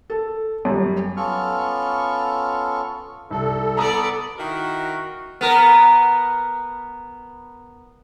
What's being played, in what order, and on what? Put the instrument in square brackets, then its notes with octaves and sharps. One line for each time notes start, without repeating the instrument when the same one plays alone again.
[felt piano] A4
F#2 G3
[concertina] B3 C#4 F4 A4 C#6 F6
[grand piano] C2 [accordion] A4
[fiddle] B3 D5 [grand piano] A#5 B5 D#6
[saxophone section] D#3 E4 A#4 [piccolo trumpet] F#4
[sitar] B3 A#4